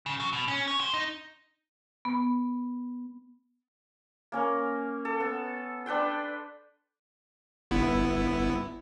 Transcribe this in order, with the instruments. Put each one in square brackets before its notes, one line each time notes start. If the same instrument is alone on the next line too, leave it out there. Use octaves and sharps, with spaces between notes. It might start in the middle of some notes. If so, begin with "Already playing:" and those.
[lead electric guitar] C#3
F#3
B2
C#4
C#5
C5
D#4
[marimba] B3
[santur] A#3 C#4 A#4
A4
B3
D4 B4 G5 C6
[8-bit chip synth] G1 B3 E4